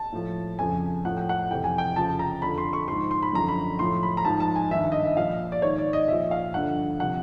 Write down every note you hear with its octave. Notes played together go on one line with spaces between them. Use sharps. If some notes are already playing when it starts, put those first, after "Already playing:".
Already playing: A5
A2 F3
F2 C#3 F3 G#5
A2 F3 F#5
G5
F#5
F2 C3 E3 G5
G#5
G5
F2 C#3 F3 A5
A#5
F2 D3 F3 B5
C6
C#6
G#2 F3 C6
C6
B5
F#2 D3 F3 A#5
B5
A2 F3 C6
B5
A#5
G#2 F3 A5
A5
G#5
G2 D#3 E5
D#5
E5
A#2 F3 F5
D5
G#2 D#3 C#5
D5
D#5
A#2 F3 E5
F5
G2 D3 F3 F#5
C3 F3 F#5